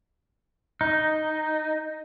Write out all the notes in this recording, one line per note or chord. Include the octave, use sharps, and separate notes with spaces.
D#4